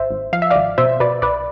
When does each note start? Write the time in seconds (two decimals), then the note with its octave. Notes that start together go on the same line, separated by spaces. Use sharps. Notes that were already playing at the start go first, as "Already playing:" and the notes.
Already playing: G#1 C5 E5
0.10 G#1
0.33 F3 F5
0.42 E5
0.51 G#1 D5 F5
0.78 B2 C5 E5
1.00 B2 B4 D5
1.22 B1 B4 D5